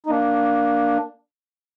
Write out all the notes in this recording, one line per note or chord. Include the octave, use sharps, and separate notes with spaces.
D#4
A#3 D4